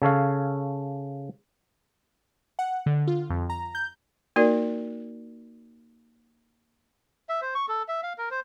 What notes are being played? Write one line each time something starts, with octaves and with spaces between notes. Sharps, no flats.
C#3 A4 C#5 F5
F#5
D3
F4
F2
A#5
G6
A#3 D#4 F#4 A#4 D5
E5
C5
C#6
A4
E5
F5
A#4
C5